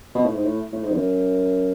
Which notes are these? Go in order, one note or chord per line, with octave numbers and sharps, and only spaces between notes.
B2
A2
G#2
A2
A2
G#2
E2
F#2